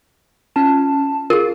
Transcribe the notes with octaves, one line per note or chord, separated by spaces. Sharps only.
C#4 F4 A5
F4 G#4 A#4